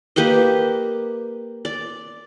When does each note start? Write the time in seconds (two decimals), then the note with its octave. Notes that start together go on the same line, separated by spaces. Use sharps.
0.16 A#3 G4 B4 D#5
1.65 D5